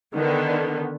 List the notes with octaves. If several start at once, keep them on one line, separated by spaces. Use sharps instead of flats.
D3 D#3 B3